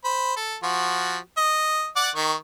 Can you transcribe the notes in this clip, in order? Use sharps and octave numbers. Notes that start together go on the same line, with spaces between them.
C5 B5
A4
F3 F#4
D#5
D5 F#5 D6
D#3 C#6